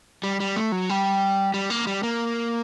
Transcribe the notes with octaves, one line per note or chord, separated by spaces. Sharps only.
G3
G3
A3
F#3
G3
G3
A#3
G3
A#3